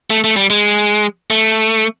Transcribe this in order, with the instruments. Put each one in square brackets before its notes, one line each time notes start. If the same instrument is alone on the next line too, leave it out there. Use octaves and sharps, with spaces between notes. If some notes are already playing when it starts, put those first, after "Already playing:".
[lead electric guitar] A3
A3
G3
G#3
A3